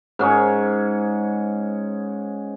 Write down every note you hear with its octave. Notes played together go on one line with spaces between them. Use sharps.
G#2 C#4 G#4 C#6